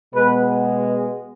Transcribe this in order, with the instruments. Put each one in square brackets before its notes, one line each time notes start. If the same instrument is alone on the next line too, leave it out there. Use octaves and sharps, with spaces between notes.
[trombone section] B2 G#3 B3 B4